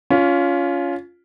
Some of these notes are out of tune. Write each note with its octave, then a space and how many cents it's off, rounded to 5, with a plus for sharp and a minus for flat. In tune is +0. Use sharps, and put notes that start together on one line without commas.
C#4 +25 F4 +0